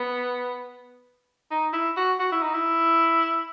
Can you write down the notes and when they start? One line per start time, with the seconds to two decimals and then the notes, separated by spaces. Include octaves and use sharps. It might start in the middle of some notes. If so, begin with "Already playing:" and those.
Already playing: B3
1.51 D#4
1.73 E4
1.97 F#4
2.20 F#4
2.32 E4
2.42 D#4
2.54 E4